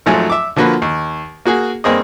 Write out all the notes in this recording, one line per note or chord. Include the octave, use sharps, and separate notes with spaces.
G#1 G#2 F3 F#3 A3 G#5
E5 D6
D3 F3 A#3 F#4 B4
D#2
A#3 F#4 G#4
G2 A#3 C4 G#4 D#5